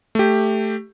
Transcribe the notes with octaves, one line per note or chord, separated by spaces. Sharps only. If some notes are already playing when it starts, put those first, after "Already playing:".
A3 G4